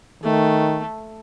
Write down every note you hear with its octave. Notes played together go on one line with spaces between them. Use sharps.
D#3 A3